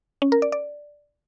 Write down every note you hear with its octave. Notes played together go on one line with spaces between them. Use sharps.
C#4
A#4
D5
D5